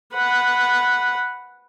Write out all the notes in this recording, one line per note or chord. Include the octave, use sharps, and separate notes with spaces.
B4 F#5